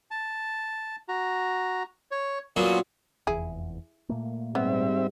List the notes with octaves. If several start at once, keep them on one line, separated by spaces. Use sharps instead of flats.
A5
F#4 A#5
C#5
A#2 F#3 B3 C#4 F4
F1 E2 E4 G#4
A#2 A3 A#3
G#2 G3 B3 C4 E5